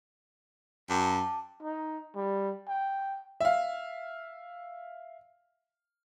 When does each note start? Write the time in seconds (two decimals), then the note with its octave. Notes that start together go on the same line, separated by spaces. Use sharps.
0.89 F#2 G5 A5 D6
1.63 D#4
2.15 G3
2.68 G5
3.41 E5 F5